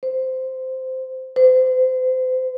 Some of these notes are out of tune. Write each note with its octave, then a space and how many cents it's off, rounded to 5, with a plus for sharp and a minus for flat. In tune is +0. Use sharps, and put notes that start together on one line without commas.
C5 -10
C5 -30